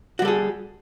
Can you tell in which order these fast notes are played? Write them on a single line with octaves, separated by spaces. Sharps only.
F#4 G3 A4 G#4